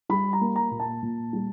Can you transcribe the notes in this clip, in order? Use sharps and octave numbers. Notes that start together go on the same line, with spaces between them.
G3 B5
A#5
A#3
A#5
A#2
A5
A#2
G3